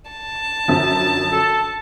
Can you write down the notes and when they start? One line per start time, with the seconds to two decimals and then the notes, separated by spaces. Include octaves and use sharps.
0.11 A5
0.68 F#2 D3 F3
1.32 A4